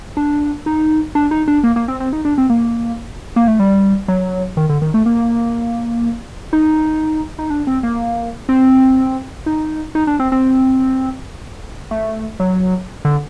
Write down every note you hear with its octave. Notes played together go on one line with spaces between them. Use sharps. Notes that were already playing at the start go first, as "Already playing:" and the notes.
D4
D#4
D4
D#4
D4
A#3
A#3
C4
C4
D#4
D4
C4
A#3
A#3
A3
G3
F#3
D#3
D3
D#3
A3
A#3
D#4
D#4
D4
C4
A#3
C4
D#4
D#4
D4
C4
C4
A3
F#3
D3